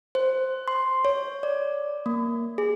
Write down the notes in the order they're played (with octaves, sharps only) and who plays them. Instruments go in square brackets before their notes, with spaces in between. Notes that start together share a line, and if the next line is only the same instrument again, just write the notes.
[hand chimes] C5
C6
C#5
D5
A#3
G#4